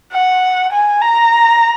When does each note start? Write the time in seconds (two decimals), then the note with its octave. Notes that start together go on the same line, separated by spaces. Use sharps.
0.12 F#5
0.72 G#5
1.02 A#5